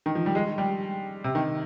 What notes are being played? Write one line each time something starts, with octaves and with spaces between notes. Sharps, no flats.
D#3
F3
G3
G#3
G3
C3
D#3